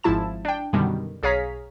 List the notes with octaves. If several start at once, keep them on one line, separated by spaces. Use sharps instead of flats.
G#1 G#2 F3 E4 A5 E7
D4 G5
F#2 B2 D3 D#3 G3
B1 G#4 C#5 F5 A#5 B6